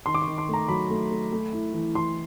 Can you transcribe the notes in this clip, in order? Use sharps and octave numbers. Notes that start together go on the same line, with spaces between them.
D#3 C6
D6
C#6
D#3
C6
A3
A#5
F#3 B5
A3
A3
A3
E4
E3
E3 C6